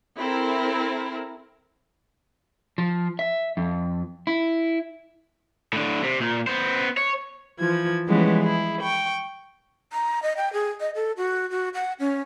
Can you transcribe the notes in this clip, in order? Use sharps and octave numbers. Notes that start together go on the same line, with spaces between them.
C4 E4 A4 A#4
F3
E5
F2
E4
A2 D3
C3
A#2
B3 C5
C#5
E3 F3 G#6
E3 F3 G3 G#3 B3 C#4
E4 G#4
G5 C#6
A#5
D#5
G5
G#4
D#5
A4
F#4
F#4
F#5
C#4